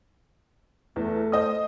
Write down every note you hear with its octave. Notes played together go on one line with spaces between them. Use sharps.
E2 A3
C5 D#5 D#6